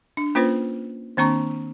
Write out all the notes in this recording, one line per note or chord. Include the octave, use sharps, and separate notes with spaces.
D4
A#3 C#4 F4 B4 C5
D#3 A#3 C4 D4 A#5 C#6